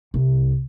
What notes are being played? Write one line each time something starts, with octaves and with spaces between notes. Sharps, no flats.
C2